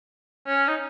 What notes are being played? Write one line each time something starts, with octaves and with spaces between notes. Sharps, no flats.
C#4
D#4